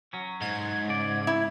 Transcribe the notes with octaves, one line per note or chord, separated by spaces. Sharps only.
F#3 C#4
G#2 G#6
C#3 D5
E4